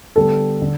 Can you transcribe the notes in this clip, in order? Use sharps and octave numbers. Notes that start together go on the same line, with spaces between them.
D3 G3 B3 A4
D3